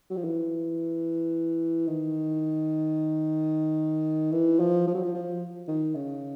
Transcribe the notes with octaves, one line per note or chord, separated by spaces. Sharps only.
F#3
F3
E3
D#3
E3
F3
F3
F#3
F3
F3
D#3
C#3